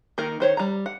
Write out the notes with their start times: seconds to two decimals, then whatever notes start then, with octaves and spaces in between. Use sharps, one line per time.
0.18 D#3 A#3 D#4 A#4
0.40 D#3 C5 C#5
0.57 G3 A#5
0.86 F#5